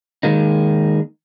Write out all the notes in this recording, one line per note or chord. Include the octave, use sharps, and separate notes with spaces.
D#3 G#3 A#3 D#4